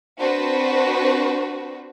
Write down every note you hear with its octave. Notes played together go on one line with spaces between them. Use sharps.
C4 D4 F#4 B4 C5